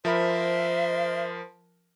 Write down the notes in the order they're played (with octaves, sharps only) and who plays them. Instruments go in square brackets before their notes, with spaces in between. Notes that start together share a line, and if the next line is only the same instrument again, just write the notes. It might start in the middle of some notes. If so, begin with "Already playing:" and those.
[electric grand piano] F3 A#4 B5 [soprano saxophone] C5 [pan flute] E5